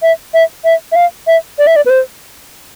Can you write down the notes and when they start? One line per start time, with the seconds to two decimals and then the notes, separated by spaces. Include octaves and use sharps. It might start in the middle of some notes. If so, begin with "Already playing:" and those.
0.02 E5
0.34 E5
0.64 E5
0.92 E5
0.96 F5
1.27 E5
1.59 D5
1.67 E5
1.76 D5
1.86 B4
1.90 C5